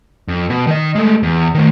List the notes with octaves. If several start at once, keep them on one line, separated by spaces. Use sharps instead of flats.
F2
B2
D#3 D#5
G#3 A3
E2
D#3 A3